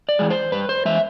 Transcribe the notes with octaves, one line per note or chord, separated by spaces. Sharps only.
D5
E3 G#3
C5
G2 B4
C5
E3 G#3 E5